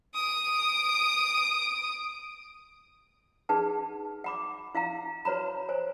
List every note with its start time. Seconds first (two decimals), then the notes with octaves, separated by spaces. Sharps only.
0.15 D#6 D7
3.49 D#4 G#4 B4 F#5 A5
4.24 F#5 B5 D6
4.75 E4 F5 F#5 A#5
5.25 F#4 B4 C#5 A#5 B5
5.69 C5 C#5 G#5